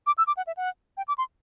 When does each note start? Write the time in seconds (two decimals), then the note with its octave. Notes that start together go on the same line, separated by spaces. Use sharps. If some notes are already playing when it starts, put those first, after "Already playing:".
0.07 D6
0.18 E6
0.27 D6
0.37 F#5
0.47 E5
0.57 F#5
0.97 G5
1.08 D6
1.18 C6